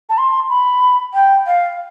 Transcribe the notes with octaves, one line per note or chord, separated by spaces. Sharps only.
A5
C6
B5
G5
F5